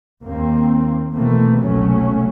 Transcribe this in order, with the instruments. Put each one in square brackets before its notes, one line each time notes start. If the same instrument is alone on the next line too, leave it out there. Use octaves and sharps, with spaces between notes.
[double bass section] D#2 A#3 C4
B2 E3 A3 A#3 C4
F#1 C2 B2 F#3 A3 C#4